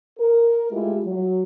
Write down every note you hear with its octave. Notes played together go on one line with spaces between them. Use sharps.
A#4
G#3 A3 E4 F4 G4
F#3